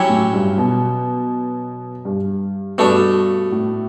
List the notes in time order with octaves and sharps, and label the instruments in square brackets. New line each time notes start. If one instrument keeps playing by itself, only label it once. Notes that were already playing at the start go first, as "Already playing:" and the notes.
Already playing: [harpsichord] F#3 C#4 E4 G4 C#5
[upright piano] A2
G2
B2
G2
[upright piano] G2 [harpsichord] B2 A3 D4
[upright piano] A2